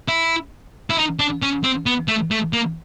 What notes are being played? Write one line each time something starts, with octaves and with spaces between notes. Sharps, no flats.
E4
E4
D#4
D4
C#4
C4
B3
A3
A3
A#3